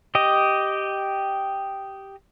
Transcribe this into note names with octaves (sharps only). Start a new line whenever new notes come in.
G4 D#5